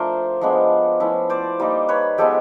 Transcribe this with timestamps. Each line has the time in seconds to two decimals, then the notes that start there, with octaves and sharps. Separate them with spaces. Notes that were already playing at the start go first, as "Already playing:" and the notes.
Already playing: F3 A3 D4 F4 A#4 C5
0.41 F3 G#3 B3 D4
1.00 F3 A3 C#4 E4
1.30 C5 D5
1.59 G3 A#3 D#4
1.88 B4 C#5
2.18 F3 G#3 B3 G4 A4